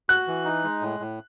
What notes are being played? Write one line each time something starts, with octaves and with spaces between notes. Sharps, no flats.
F#4 F#6
E3
D#4
G#3
A2
A2